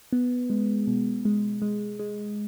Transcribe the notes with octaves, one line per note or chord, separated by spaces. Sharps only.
B3
G#3
B2
G#3
G#3
G#3